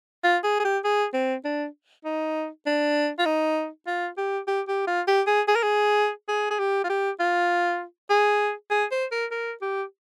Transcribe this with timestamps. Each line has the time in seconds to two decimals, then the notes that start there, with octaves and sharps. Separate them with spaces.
0.24 F4
0.44 G#4
0.60 G#4
0.64 G4
0.84 G#4
1.14 C4
1.45 D4
2.05 D#4
2.66 D4
3.19 F4
3.26 D#4
3.87 F4
4.18 G4
4.47 G4
4.68 G4
4.87 F4
5.08 G4
5.27 G#4
5.48 G#4
5.56 A#4
5.63 G#4
6.29 G#4
6.50 G#4
6.59 G4
6.84 F4
6.90 G4
7.20 F4
8.10 G#4
8.71 G#4
8.91 C5
9.12 A#4
9.31 A#4
9.62 G4